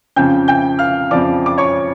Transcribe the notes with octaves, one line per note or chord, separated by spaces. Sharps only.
F2 C#3 F3 G5 G6
G5 G6
F5 F6
F2 C#3 F3 D5 D6
D6
C#5 C#6